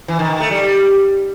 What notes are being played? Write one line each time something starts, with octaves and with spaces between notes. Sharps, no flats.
E3
D#3
D#3
A3
G3